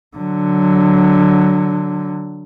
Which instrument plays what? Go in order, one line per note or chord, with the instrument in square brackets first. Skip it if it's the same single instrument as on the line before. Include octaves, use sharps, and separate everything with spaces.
[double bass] D3 F#3